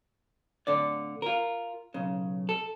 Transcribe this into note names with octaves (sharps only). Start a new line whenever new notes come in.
A2 D3 D5
F4 A#4
B1 C#3
A4